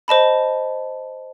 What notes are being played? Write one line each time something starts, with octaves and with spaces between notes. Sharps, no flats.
C5 D#5 A5 B5